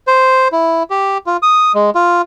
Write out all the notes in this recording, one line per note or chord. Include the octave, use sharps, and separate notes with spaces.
C5
E4
G4
F4
D#6
G#3
F4